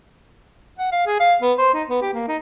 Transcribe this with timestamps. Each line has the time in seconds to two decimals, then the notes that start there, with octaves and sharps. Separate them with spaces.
0.79 F#5
0.92 F5
1.06 G#4
1.20 F5
1.42 B3
1.58 C5
1.74 D#4
1.88 B3
2.02 G4
2.13 A#3
2.28 D#4